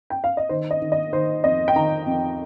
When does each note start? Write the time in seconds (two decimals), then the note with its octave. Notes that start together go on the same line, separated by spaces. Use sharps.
0.10 G5
0.24 F5
0.37 D#5
0.49 D#3 C5
0.71 D#5
0.82 D#3
0.92 D#5
1.13 D#3 C5
1.44 F2 D#5
1.68 G5
1.76 D#3 A#5
2.06 F2